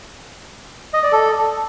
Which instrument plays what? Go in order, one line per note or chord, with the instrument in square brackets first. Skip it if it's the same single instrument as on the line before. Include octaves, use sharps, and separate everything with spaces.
[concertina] D#5
D5
A4